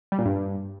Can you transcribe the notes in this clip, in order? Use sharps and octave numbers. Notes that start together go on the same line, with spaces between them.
G3
A#2
G2